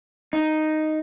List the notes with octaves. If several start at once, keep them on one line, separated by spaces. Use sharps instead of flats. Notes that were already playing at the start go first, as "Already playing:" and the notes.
D#4